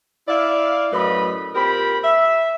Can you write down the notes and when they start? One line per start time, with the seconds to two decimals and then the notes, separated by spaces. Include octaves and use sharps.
0.28 E4 D5 F5
0.92 F#2 A2 F#3 B4 D#5 B5
1.55 A#2 C4 G4 A#4 B5
2.04 E5